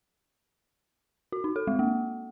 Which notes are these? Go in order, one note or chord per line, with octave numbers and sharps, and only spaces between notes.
F#4
D#4
A4
G#3
A#3